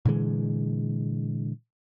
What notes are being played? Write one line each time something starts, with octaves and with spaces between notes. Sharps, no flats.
A#2 D3 E3 G#3